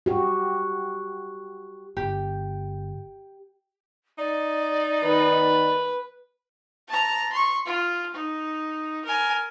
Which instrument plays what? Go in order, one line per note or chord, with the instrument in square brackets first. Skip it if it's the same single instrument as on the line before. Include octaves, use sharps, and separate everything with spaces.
[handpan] F#4 G4
[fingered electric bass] G1 [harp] G4
[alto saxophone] D#4 [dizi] D5
[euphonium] D#3 [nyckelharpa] B4
[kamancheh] A5 A#5
C6 C#6
F4
D#4
A#4 G#5